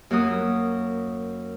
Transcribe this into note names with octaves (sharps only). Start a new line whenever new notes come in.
F#2 A#3 F#4 D#6